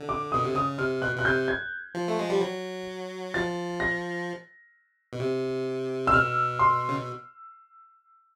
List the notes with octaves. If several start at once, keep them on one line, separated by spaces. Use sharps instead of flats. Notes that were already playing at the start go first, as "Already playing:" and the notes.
Already playing: D3
D6
B2 D#6
C3
C#3 D#6
C3 F6
B2 F#6
B2 F#6
C3 G6
G#6
F3
A3
G#3
G3
F#3
F3 A6
A#6
B2
C3
E6
B2 F6
C6
C#3